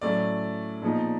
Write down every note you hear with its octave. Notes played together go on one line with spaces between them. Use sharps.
A2 F#3 A3 C#4 D5
A#2 F3 G#3 B3 D#4